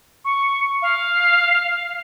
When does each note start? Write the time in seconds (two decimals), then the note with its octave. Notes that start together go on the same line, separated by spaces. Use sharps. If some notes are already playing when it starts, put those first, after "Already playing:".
0.24 C#6
0.82 F5